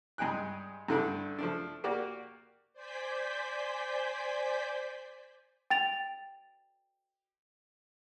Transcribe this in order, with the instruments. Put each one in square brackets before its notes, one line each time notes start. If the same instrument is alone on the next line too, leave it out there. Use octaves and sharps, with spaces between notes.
[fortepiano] G2 G#3 G#4 G5 F#6
G2 D3 A3 D4
F3 A3 D4
A#3 F#4 G4 D5
[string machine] C5 D5 G#5 G6 B6
[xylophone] G5 A6 F7